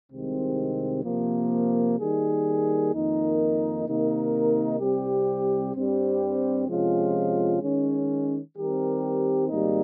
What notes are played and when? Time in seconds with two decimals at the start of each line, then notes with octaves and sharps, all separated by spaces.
0.10 C2 C3 D#3 G#3 C4
1.04 C3 F3 A#3
1.98 D#3 G3 A#3 D#4 G#4
2.92 F2 D#3 A#3 D#4 A#4
3.86 C3 D#3 A#3 D#4 A#4
4.80 C2 C3 G3 C4 G4
5.74 G2 G3 C4 G4
6.67 C3 F3 G#3 C#4 F4
7.61 D#3 G#3 C#4
8.55 D#3 G3 C4 G4 A#4
9.49 G#1 G#2 G3 A#3 D#4